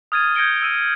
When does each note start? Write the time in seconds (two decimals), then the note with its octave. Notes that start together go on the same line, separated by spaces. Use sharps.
0.12 D#6 F6 G#6 A6 D#7
0.35 G6 G#6 A#6 C#7 D7 G7
0.62 E6 D#7